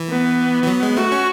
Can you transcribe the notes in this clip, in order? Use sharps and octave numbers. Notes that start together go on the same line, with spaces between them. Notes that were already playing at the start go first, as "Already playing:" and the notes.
Already playing: E3
B3
E3
F#3
G#3
A3 F#4
C#4